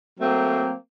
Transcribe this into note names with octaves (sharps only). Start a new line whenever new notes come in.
F#3 A3 A#3 C4